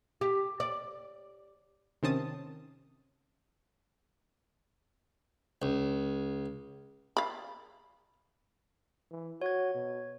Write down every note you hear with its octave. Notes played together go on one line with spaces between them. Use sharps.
G4
D5
C3 D#3 C4 C#4 A5 D#6
C#2
F5 B5
E3
F#4 C#5 G#6
B2